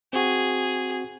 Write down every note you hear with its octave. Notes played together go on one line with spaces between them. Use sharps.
C4 F#4 G#4